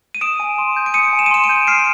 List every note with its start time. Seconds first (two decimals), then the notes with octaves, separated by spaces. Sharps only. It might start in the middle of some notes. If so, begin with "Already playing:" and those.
0.15 D#7
0.21 D#6 D7 E7
0.40 G#5
0.58 C6
0.76 G6
0.86 D7
0.94 D#6 C#7 D#7
1.13 G#5
1.19 E7
1.26 D#7
1.31 C6 D7 E7
1.44 D7 E7
1.49 G6
1.67 F6 C7 D7